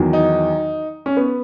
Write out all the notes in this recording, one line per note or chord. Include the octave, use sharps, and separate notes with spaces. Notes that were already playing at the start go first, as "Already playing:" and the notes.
Already playing: E2 D#3 F#3
D#4
C#4
B3